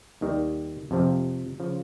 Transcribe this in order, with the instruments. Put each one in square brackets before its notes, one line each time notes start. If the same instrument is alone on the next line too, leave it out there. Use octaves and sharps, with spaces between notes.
[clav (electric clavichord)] D#2 D#3 G3
F2 C3 F3
C#3 F3